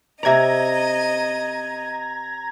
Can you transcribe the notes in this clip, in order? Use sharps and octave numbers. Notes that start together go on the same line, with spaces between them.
C3 D5 D#5 A#5 G#6 A#6